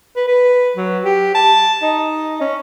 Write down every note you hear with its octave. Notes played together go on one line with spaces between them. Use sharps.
B4
B4
F#3
G4
A5
D#4
C#4